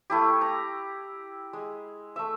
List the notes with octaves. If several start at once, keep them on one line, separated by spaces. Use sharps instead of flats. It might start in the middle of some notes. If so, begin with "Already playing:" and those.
A3 E4 G4
A#5
G#3
A3 E5